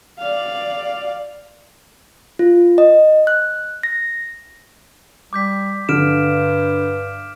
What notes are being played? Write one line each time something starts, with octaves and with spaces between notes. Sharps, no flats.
D5 F5
F4
D#5
F#6
A#6
G3 D6 G6 B6
G2 D3 F6 D7 E7